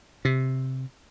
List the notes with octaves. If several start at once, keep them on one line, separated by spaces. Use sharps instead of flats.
C3